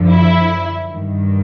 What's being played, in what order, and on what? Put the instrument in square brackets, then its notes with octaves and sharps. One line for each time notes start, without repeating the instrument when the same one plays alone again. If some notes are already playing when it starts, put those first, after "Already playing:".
Already playing: [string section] F#2 D3 F3
E4
G2 D#3